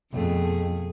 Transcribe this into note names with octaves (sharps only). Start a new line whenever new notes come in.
F2 B2 A3 G#4